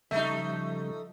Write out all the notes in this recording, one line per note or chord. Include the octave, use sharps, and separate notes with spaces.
C#3 F3 G3 A3 D#4 E5